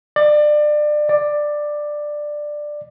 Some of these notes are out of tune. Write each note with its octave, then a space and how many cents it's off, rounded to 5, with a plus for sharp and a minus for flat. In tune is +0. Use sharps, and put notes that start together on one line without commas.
D5 +25
D5 +10